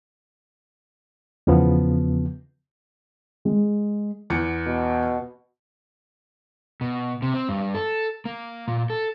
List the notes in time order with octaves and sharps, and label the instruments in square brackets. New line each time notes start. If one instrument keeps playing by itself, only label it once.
[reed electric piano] E2 C#3 F3 B3
[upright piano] G#3
[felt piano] E2 B3 C#7
[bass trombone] B2
[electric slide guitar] B2
C3
C4
G2
A4
A#3
A#2
A4